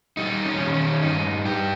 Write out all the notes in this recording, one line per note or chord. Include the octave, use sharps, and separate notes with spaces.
G3 D#4
C#4
D#3
C#4
G2 D#4
G2 G4